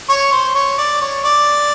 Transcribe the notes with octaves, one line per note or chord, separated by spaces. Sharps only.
C#5
C5
C#5
D5
C#5
D5